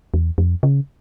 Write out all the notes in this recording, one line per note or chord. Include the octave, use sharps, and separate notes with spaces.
E2
F2
C#3